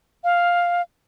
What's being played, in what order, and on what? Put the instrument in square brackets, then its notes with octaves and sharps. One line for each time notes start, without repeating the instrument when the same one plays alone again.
[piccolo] F5